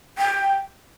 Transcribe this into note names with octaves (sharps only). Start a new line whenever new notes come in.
G5